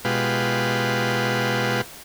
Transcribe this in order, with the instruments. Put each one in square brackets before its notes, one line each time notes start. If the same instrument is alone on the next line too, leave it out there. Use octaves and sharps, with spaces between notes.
[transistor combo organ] B2 G#3 F4 G4 B4